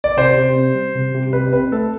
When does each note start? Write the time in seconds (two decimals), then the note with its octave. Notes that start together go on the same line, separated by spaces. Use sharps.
0.04 D5
0.17 C3 C5
0.37 C3
0.56 C4
0.75 G3
0.95 C3
1.14 C3
1.33 C3 B4
1.53 C4 B4
1.72 A3 A4